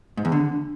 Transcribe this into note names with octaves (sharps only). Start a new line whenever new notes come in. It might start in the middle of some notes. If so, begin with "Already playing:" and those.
G#2
E2
D3